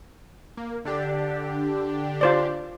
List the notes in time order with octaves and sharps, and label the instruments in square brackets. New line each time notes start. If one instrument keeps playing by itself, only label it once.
[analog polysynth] A#3
D3 D4 G4
[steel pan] F4 C5 D5